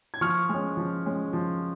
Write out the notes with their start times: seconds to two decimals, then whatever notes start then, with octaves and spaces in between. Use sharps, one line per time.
0.14 G#6
0.21 F3 C#6 F6
0.49 G#3 C#4
0.77 F3
1.06 G#3 C#4
1.33 F3